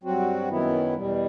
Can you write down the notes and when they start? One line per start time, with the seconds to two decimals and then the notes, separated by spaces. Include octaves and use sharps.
0.03 G2 F#3 C4 F#4
0.49 F#2 D#3 F#3 B3 E4
0.94 E2 B2 G3